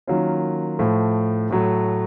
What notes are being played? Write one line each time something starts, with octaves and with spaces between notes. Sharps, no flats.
D#3 F#3 A#3 C#4 F4
A2 F3 A3
A2 F#3 A3